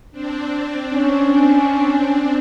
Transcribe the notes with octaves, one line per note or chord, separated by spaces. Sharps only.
C4 D4
C#4